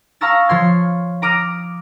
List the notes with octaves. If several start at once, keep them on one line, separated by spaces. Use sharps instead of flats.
F5 A5 A#5 C#6 E6 A6
F3 C#5 C6 G#6
A#5 D6 D#6 F6 A#6